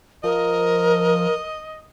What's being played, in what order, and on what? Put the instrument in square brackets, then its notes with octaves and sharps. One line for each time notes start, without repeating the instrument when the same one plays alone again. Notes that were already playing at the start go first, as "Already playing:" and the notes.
[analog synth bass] F3 [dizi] A#4 [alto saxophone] D#5